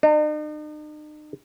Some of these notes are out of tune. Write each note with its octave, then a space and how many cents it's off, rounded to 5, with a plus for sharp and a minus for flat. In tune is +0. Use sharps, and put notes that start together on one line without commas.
D#4 -45